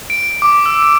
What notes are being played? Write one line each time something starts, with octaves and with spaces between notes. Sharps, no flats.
D7
D6
E6
D7